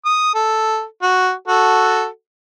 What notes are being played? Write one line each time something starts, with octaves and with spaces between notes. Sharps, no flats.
D#6
A4
F#4
F#4 A4